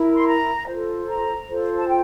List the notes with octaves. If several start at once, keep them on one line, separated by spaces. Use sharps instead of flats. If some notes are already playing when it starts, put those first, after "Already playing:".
Already playing: E4 A#4
C6
A#5
F4 A4 C5
A#5
F4 A4 C5
A5
G5